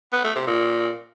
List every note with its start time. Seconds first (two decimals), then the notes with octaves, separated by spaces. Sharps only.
0.13 B3
0.24 A3
0.36 C3
0.47 A#2